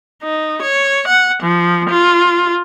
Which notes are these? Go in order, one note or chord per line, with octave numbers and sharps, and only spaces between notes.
D#4
C#5
F#5
F3
F4